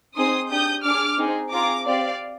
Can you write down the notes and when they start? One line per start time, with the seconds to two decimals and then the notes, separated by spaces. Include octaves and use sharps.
0.17 C4 D#4 G#4 C6 D#6
0.51 D4 G4 D#6 G6
0.84 D4 G#4 D6 F6
1.19 C4 D#4 G#4
1.52 C4 F4 G#4 A#5 D6
1.86 C4 G4 D5 F5